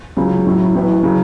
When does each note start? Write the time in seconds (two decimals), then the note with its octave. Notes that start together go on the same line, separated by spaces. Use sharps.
0.17 C#2 C#3 F#3
0.45 A2 F#3 C#4 E4
0.75 A1 A2 F#3 B3 E4
1.03 C#3 F#3